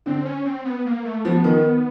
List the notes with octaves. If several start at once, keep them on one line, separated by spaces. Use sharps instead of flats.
D3 C4
C#4
C4
B3
A#3
A3
F3 B3
D#3